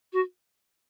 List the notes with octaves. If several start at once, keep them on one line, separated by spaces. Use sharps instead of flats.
F#4